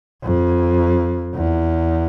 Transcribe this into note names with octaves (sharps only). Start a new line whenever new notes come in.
F2
E2